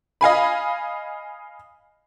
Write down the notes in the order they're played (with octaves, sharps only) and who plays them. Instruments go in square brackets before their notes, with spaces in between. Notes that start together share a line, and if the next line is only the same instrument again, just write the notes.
[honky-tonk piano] D#5 F5 G#5 B5